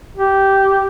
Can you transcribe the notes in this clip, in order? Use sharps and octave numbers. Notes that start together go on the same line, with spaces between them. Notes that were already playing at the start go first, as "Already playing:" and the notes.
G4